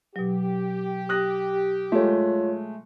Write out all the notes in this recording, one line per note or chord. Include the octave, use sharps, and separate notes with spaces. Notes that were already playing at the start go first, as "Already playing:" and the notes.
B2 F#3 G4
D#6 F#6 A#6
G#3 A3 F4 C#5